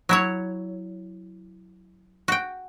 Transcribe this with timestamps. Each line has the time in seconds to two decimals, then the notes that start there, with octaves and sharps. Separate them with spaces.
0.09 F#3 E4 C#5
2.28 F#4 G5